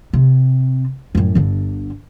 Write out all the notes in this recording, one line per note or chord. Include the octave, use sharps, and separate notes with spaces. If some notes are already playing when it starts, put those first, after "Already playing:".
C3
F#2 A2
G1 D3